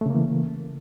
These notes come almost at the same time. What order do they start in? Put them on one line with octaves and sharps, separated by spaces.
A3 C#3 A#3 E3